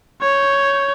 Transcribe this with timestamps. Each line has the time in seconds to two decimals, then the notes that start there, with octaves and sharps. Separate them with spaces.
0.21 C#5 G6